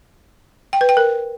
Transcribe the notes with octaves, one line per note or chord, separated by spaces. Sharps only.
G5
B4
G5
A#4